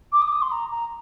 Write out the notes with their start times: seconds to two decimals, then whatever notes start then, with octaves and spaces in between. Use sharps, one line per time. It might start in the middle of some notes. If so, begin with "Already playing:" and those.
0.12 D6
0.22 D#6
0.28 D6
0.32 D#6
0.42 C6
0.52 A#5
0.71 A#5